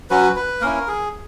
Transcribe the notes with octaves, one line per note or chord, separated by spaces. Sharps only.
F#3 C#4 F#4 B4
B4
A#3 C#4 E4 A#4
G#4